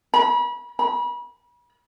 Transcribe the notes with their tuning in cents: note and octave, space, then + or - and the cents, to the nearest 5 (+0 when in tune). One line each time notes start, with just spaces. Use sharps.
B5 -35
B5 -35